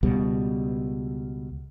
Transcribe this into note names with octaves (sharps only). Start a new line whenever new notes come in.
C#2 B2 G3